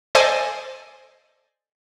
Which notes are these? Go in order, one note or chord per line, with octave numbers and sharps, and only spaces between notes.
A4 C5 D5 D#5 G#5